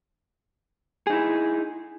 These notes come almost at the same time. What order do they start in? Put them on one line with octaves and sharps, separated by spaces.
G#4 D#4 E4